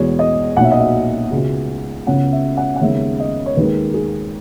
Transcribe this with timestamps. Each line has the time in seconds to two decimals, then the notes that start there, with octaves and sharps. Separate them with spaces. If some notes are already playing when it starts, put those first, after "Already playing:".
Already playing: E2 B2 G#3 B3 C#5
0.19 D#5
0.57 B1 A#2 F#3 F#5
0.64 E5
0.72 D#5
0.79 E5
1.31 C#2 B2 G#3
2.07 C#2 C#3 G#3 B3 F#5
2.32 E5
2.57 F#5
2.76 F#5
2.81 D#2 C#3 G#3 B3 E5
3.20 D#5
3.46 C#5
3.57 D#2 D#3 G#3 B4
3.94 G#4